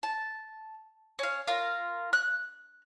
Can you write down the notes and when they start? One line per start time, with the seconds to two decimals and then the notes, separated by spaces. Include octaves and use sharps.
0.03 A5
1.19 C#4 F5
1.48 F4 A#4
2.13 F#6